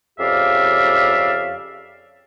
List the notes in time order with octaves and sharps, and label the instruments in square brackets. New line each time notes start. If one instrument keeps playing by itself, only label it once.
[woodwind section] F2 C#3 G4 D5 E5 F5